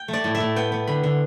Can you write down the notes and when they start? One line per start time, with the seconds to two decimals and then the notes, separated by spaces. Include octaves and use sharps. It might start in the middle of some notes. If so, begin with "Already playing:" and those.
Already playing: G5
0.08 A3
0.13 D5
0.24 A2
0.35 E5
0.40 A2
0.56 B3 G5
0.72 B3
0.87 D3 B5
1.03 D3